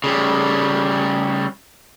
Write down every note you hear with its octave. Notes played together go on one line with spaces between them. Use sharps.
C#3 G3